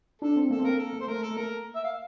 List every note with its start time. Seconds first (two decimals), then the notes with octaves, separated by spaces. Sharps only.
0.21 D4 A4
0.36 C4
0.50 A#3 A4
0.59 C4
0.64 A#3 A#4
0.79 A4
0.93 A#3
1.00 C5
1.08 A3 A#4
1.22 A4
1.31 A3
1.37 A#3 A#4
1.75 E5
1.84 F5